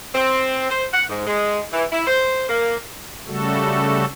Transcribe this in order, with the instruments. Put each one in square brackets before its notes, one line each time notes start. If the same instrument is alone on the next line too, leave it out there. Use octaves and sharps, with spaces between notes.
[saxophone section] C4
C5
F#5
G#2
G#3
E3
E4
C5
A#3
[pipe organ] C#3 G3 A3 F#4 A4